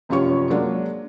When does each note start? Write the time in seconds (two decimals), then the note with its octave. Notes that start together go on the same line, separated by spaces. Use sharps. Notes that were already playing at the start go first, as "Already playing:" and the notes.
0.09 F1 F#2 F4 G4 C#5 C#6
0.50 F#3 G#3 A#3 D4